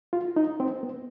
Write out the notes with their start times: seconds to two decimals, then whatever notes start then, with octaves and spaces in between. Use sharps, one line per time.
0.13 F4
0.36 D#4
0.60 C4
0.83 B3